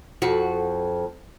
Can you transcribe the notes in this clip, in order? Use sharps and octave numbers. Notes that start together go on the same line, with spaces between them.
F2 F#4